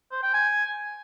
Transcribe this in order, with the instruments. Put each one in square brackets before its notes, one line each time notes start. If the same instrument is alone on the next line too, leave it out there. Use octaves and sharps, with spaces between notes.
[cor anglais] C5
G5
G#5